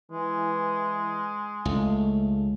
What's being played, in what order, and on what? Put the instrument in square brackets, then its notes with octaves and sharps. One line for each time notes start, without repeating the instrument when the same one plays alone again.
[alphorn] E3 [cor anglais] G#3
[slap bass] C#2 [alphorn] A3